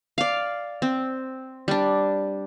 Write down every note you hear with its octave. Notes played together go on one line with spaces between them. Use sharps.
D5 F5
C4
G3 D4